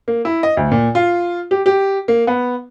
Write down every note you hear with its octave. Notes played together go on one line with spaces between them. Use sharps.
A#3
E4
D#5
D2
A#2
F4
G4
G4
A#3
B3